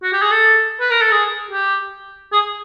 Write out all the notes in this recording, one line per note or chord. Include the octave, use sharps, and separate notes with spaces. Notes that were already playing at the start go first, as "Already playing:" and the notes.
F#4
G4
G#4
A4
B4
A#4
A4
G#4
G4
G#4